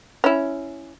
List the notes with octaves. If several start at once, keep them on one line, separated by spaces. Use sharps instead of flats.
C#4 E4